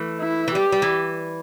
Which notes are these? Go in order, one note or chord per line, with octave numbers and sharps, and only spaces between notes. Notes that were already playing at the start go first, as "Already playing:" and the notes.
Already playing: E3 A3
E4
E3
G3 G4
G3
E3